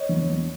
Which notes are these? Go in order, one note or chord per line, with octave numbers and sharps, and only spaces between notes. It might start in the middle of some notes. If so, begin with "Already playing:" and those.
Already playing: C#5 D#5
E2
E2